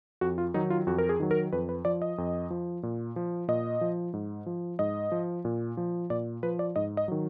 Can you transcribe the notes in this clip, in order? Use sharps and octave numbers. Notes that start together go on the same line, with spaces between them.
F2 F#4
F4
D#3 F#3 D#4
F4
F2 F#4
A#4
G#4
D#3 F#3
A#4
F2 B4
B4
F3 D5
D#5
F2
F3
A#2
F3
A#2 D#5
F3
G#2
F3
G#2 D#5
F3
A#2
F3
A#2 D5
F3 B4
D5
G#2 D#5
D#5
D#3 F#3